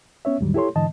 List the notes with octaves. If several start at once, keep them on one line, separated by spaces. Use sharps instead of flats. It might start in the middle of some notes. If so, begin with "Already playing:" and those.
B3 C#4 C#5 E5
D#2 G#2 D3 F#3 G3
E4 G4 A4 C#5 C6
G#2 D3 E3 D#5 A5